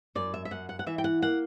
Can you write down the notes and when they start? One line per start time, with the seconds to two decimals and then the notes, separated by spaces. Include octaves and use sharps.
0.15 F#2 D5
0.34 E5
0.45 E5
0.51 F#2 F#5
0.69 F#5
0.79 F#5
0.86 E3 E5
0.98 G5
1.04 F#5
1.22 A#3 F#5